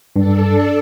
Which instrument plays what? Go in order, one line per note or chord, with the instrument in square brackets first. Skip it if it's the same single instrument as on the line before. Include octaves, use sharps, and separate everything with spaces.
[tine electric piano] G2 [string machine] D4 A4